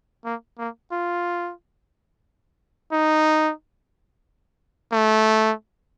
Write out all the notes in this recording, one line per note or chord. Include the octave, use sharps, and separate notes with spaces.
A#3
A#3
F4
D#4
A3